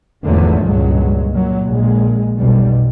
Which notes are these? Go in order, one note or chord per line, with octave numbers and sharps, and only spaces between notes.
G#1 E2 D3 F3 F#3 A3
C#2 G2 A#2 F#3 G#3
A#2 F#3
A#1 G#3
F1 B1 B2 G3